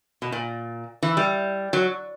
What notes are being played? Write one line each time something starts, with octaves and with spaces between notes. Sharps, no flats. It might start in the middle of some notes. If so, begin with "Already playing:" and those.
B2
A#2
E3
G3
F#3